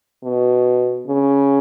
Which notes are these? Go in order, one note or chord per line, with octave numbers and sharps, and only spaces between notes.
B2
C#3